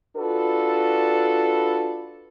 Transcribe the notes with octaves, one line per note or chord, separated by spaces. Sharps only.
D4 F4 F#4 A4 B4